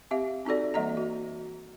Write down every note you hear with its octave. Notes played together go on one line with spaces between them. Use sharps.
C4 G4 E5 F5
C4 D#4 F#4 A4 D5
E3 G3 A#3 D#5 E5 A#5
F#4